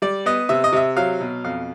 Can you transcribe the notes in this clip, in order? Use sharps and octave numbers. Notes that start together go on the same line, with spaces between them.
G3 D5
B3 D#5
C3 E5
D#5
C3 E5
F#3 F5
B2
F2 F5